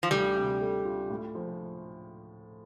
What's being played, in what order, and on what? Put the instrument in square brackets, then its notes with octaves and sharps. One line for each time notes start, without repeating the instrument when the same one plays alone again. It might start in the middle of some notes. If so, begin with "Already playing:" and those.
[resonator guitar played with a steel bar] F3
[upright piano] D2 [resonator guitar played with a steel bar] G3
[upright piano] C3
A3
F4
A2
F3